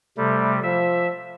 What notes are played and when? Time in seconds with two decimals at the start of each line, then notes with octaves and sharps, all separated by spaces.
0.17 C3 G3 A3
0.63 F3 E5